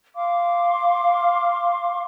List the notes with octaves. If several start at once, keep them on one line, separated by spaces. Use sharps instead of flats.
F5 C6 D6